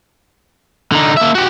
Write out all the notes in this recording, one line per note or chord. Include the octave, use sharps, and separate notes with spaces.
D3 D#4
A#3 E5
F#4 G4